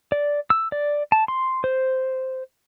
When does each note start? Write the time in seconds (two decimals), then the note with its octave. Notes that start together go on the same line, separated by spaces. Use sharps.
0.12 D5
0.50 E6
0.72 D5
1.12 A5
1.28 C6
1.64 C5